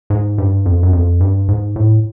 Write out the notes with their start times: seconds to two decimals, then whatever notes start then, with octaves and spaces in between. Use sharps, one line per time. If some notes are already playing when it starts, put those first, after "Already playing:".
0.10 G#2
0.38 G2
0.66 F2
0.83 F#2
0.93 F2
1.20 G2
1.48 G#2
1.76 A2